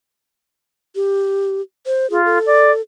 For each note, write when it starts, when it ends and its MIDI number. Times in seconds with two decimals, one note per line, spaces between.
0.96 1.61 67
1.86 2.09 72
2.10 2.38 65
2.10 2.24 68
2.25 2.81 69
2.46 2.71 74